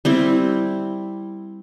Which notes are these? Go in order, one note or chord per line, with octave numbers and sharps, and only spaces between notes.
G3 C4 E4